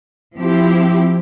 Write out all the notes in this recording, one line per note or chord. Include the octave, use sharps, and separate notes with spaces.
F3 C4 E4 G4